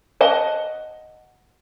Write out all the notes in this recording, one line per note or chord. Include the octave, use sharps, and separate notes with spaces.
D#5 F#5 A5